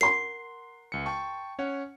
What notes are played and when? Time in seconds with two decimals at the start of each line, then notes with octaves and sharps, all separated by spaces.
0.01 A#4 F#5 C6 C7
0.92 C#2 C#7
1.06 G5 A5 C#6
1.59 C#4 C#5 F#5